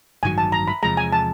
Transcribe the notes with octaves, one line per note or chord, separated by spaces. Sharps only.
A1 G2 D#3 F#3 G#5
A5
A#5
B5
E2 C3 F3 G#3 A#5
G#5
A5